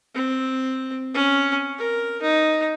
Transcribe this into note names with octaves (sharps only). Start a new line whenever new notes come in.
C4
C#4
A#4
D#4